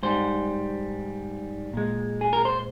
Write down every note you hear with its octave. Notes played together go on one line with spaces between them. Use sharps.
G#2 G3 C5
A#2 G#3
G#4
A#4
C5